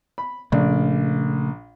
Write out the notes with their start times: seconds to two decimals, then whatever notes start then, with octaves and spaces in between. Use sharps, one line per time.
0.18 B5
0.52 A#1 C#3 A3 D5